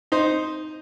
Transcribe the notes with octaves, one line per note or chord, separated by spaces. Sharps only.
D#4 C5